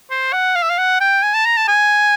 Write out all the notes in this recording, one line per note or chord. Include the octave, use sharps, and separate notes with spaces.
C5
F#5
F5
E5
F5
F#5
G5
G#5
A5
A#5
A5
G#5